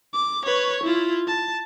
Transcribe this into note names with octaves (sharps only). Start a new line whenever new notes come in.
D6
B4 C#5
E4 F4
A5